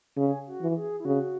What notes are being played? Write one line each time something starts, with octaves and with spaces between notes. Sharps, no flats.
C#3 G#4
F#4
E3
G#4
E4
C#3 F#4